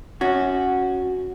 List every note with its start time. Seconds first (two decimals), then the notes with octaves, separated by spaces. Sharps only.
0.21 C#4 F#4